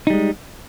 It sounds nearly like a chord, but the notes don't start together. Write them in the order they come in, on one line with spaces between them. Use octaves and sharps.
D#4 G3 G#3